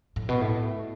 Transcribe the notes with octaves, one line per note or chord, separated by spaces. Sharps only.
A2
B2
A2